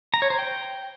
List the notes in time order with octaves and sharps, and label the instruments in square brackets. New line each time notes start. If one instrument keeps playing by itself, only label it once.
[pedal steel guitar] A#5
C#5
C5
G5